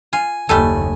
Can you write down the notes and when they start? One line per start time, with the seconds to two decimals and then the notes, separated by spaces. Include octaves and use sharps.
0.13 F4 G#5
0.49 F#1 D#2 G3 A3 A4 G#5